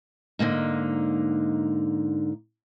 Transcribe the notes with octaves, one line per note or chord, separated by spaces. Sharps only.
G#2 D3 A#3 D#4